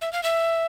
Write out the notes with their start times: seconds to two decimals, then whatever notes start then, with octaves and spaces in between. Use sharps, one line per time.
0.01 E5
0.13 F5
0.23 E5